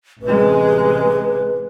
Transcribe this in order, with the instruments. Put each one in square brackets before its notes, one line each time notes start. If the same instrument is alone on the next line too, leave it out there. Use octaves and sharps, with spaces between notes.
[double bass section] A1 C3 G#3 [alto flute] B4